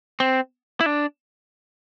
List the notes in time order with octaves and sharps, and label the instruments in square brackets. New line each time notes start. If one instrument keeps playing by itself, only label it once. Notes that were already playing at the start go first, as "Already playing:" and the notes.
[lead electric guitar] C4
E4
D4